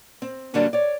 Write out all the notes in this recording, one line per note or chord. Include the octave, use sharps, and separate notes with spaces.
C4
G2 D3 F#3 G3 A#3 D4
C#5 D5